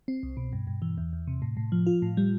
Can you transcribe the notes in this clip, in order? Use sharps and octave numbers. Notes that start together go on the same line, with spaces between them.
C4
C2
B2
G2
G2
E3
E2
E2
C3
A2
A2
F3
F4
A2
G3